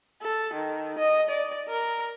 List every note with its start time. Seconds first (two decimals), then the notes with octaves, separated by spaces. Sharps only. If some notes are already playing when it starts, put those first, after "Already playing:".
0.22 A4
0.54 D#3
0.99 D#5
1.29 D5
1.68 A#4